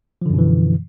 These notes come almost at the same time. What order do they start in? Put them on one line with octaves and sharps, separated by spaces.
F3 D3 F#2 B2 E3